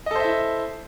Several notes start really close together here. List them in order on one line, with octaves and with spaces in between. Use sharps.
D#5 A4 C5 E5 E4